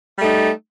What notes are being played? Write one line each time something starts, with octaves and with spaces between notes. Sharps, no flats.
G3 A3 D#4